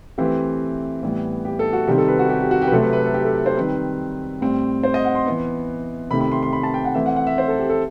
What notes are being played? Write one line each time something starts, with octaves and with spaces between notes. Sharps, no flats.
E3 A3 C4 G4
A2 E3 G3 B3
G4
A4
F#4
C3 D#3 G3 C4 G4
A4
B4
F#4
G4
G4
F#4
G4
B4
C3 F#3 A3 C4 A4
B4
B4
A4
G4
A4
C5
D#3 G3 C4 B4
A2 G3 C4
C5
D#5
F#5
C6
E3 B3
C3 D#3 A3 C4 B5
B5
C6
C6
B5
A5
G5
F#5
E3 A3 C4 E5
F#5
F#5
E5
C5
A4
G4
A4